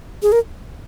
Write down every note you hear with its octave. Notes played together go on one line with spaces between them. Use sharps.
G#4
A#4